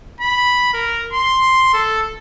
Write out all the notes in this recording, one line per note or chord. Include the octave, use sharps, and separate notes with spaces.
B5
A#4
C6
A4